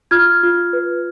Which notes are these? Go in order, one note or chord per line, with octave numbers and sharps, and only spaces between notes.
F4 F6 G#6
F4
B4